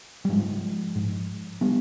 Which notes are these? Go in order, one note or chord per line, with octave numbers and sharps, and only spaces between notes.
G3
G#2 F3 G#3
G#2
G3 B3